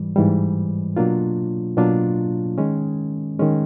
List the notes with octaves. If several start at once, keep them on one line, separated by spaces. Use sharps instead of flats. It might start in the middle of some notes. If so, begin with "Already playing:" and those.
Already playing: G#2 E3 G3
G#2 E3 G3
B2 F#3 A#3 D4 F4
B2 F#3 A#3 D4 F4
D#3 G#3 C#4
D#3 G#3 C#4